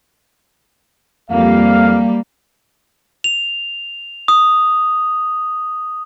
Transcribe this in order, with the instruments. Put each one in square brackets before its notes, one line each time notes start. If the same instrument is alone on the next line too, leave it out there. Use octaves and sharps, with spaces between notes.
[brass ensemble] F2 F5 [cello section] G3 A#3
[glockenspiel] F7
D#6